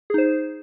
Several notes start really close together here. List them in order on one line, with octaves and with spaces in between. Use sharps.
G#4 D#4 C5